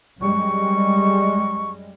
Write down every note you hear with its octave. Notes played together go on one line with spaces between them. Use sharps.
F#2 G3 G#3 C#6